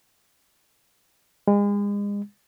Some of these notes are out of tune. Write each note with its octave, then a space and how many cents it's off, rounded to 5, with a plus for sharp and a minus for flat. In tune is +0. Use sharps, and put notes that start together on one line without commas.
G#3 -35